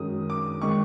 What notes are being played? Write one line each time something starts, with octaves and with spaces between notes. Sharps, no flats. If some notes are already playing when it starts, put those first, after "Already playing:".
Already playing: F#2 D#3 G#3 D#6
D6
D#3 G#3 C#6